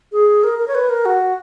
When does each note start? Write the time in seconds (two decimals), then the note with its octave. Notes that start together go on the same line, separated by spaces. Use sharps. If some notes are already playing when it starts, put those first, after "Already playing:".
0.12 G#4
0.44 A#4
0.59 A#4
0.68 C#5
0.75 B4
0.89 A#4
1.05 F#4